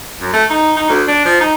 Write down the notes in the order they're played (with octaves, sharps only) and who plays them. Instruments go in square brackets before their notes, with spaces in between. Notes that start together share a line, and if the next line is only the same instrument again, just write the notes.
[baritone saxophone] F#2
A3
D#4
D#4
D2
D4
F3
D#4